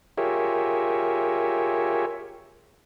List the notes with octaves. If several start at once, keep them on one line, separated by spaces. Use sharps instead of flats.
F4 G4 G#4 A#4 C#5 E5